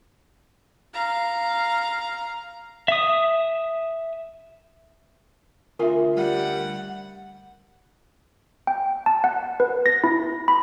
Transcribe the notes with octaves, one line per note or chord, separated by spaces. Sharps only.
F5 A#5
E5 D#6
D2 F4 A#4 E5 G#5
G3 F#5
G5
A5
F#5
B4
A#6
E4
B5